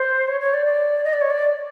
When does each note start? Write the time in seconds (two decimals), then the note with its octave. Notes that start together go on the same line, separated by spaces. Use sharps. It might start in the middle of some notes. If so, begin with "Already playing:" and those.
Already playing: C5
0.28 C#5
0.40 C#5
0.53 D5
0.66 D5
1.04 D#5
1.13 D5
1.21 C#5
1.30 D5